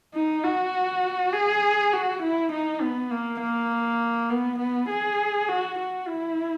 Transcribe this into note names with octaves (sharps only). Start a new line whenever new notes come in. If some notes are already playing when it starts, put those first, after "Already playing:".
D#4
F#4
G#4
F#4
E4
D#4
B3
A#3
A#3
B3
B3
G#4
F#4
F#4
E4